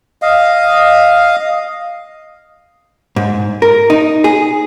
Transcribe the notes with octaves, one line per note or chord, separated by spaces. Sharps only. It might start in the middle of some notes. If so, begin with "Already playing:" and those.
D#5 F5
G#2
A#4
D#4
G#4